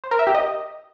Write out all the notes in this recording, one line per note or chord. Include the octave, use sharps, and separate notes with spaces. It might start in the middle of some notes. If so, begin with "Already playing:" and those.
C5
A#4
E5
G4
D#5